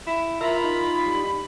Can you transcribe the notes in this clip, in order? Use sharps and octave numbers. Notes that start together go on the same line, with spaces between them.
E4
F4 A#4 E5 B5
D#4
G3